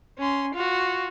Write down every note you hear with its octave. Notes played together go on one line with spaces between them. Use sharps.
C#4 C6
F4 F#4